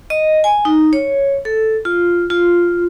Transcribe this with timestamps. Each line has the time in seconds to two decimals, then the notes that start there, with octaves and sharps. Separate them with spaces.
0.10 D#5
0.44 G#5
0.65 D#4
0.93 C#5
1.45 A4
1.85 F4
2.30 F4